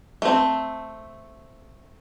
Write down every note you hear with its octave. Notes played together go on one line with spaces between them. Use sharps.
A3 C4